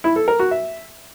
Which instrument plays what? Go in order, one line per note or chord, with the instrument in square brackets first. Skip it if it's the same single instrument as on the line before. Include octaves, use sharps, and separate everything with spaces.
[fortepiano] E4
A4
A#4
F#4
E5